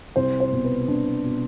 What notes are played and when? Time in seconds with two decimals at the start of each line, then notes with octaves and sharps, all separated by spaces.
0.16 C2 C5
0.40 C5
0.53 B2
0.65 B4
0.88 C2 D4
1.25 B2